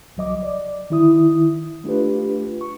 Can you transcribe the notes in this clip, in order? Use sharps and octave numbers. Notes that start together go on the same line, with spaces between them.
C2 F#3 D#5 D6
D5
D#3 E4 D#6
A3 D4 F4 G4 B4
C#6